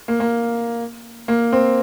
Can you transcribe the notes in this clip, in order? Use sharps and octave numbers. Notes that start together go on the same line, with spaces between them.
A#3
A#3
A#3
C4